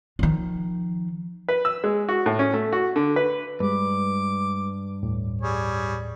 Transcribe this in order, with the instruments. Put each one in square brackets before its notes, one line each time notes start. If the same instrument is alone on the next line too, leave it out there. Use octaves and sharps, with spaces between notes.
[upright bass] D#3 F3
[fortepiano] B4
E6
G#3
F#4
A2
C#4
A3
F#4
D3
B4
[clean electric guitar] G2 [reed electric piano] G3 G#3 B4 [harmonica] D6
[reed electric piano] D#2 A2
[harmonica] G3 G#4 C#5